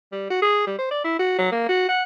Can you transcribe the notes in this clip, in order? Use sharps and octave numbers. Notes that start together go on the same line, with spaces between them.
G3
F#4
G#4
G3
C5
D5
E4
F#4
F#3
A#3
F#4
F#5